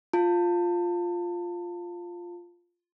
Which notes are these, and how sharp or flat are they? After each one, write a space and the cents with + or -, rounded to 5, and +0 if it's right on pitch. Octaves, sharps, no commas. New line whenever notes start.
F4 +0 A5 +30